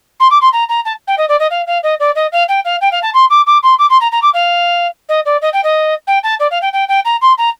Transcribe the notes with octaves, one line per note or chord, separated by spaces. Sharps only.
C6
D6
C6
A#5
A#5
A5
G5
D#5
D5
D#5
F5
F5
D#5
D5
D#5
F5
G5
F5
G5
F5
A5
C6
D6
D6
C6
D6
C6
A#5
A#5
D6
F5
D#5
D5
D#5
G5
D#5
G5
A5
D5
F5
G5
G5
G5
A#5
C6
A#5